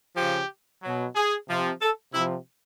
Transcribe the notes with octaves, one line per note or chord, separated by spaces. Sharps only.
C#3 F3 G4
B2 F#3
G#4
C3 F3
A4
C3 F3 E4